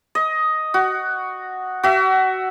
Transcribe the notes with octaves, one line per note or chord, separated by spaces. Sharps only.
D#5
F#4
F#4 E5